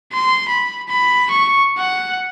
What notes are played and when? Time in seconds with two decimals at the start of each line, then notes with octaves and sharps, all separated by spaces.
0.12 C6
0.48 B5
0.88 B5
1.31 C#6
1.78 F#5